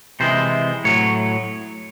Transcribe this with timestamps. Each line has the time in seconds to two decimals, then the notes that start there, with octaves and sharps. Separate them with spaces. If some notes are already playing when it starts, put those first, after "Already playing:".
0.20 C3 E3 G#3 C5
0.84 A2 F#3 C#5